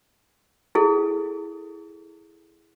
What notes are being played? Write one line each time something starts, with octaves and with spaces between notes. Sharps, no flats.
E4 G#4 A4